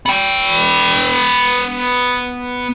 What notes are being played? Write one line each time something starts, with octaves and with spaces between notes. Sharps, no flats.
B3 G5